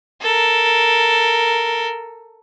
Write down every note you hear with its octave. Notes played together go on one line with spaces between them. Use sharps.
A4 A#4